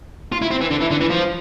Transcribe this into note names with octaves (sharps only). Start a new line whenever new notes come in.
F4
E4
C4
E3
D3
E3
D3
E3
F3